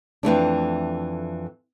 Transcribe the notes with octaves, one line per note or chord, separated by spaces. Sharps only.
F2 E3 A3 D4